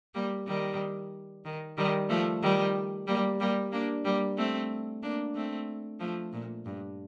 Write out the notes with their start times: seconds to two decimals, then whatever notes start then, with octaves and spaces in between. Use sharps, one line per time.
0.14 G3 A#3
0.47 D#3 G3
1.45 D#3
1.78 D#3 G3
2.10 F3 A3
2.42 D#3 G3
3.07 G3 A#3
3.40 G3 A#3
3.72 A#3 D4
4.05 G3 A#3
4.38 A3 C4
5.03 A#3 D4
5.35 A3 C4
6.00 F3 A3
6.33 A#2
6.66 G2